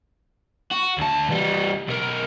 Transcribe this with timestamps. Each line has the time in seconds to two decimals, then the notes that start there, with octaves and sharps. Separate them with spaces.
0.72 F#4
0.98 D2 A5
1.30 E3 G3
1.87 B1 A#4